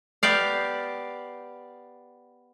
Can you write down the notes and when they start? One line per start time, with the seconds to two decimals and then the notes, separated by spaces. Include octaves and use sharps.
0.23 B3 G4 D5 F5